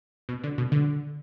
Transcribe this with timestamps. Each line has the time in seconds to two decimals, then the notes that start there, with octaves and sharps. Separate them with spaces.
0.29 B2
0.44 D3
0.58 B2
0.72 D3